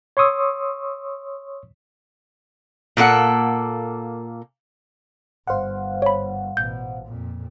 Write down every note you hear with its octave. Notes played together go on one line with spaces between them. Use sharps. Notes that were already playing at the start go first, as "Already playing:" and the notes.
C#5 C6 C#6 D#6 E6
A#2 A#3 A4 F#5
G1 C5 F5 F#5
C#5 B5
A1 B2 G6
F2 A#2